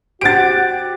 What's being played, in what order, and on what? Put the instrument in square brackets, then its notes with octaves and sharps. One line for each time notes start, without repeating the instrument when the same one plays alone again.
[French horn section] F#4 [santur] G4 C5 F#5 [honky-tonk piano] A6 D7